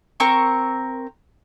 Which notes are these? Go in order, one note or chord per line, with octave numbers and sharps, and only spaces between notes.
C4 A#4 C#6